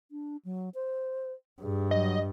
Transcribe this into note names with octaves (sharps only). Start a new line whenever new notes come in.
D4
F#3
C5
G2 G#4
F#3 D#5